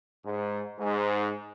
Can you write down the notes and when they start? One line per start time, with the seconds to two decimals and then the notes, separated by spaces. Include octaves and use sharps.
0.25 G#2
0.79 G#2